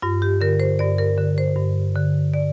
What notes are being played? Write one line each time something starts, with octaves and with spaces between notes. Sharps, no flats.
G2 F4
G4
D3 A#4
C5
G2 D5
A#4
D3
C5
G2
D3
D5